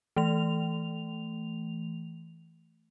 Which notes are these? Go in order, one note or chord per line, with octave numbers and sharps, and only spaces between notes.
E3 A3 F7